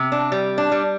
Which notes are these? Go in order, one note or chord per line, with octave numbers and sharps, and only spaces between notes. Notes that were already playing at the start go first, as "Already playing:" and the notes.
Already playing: C3
D4
G3
D4
G3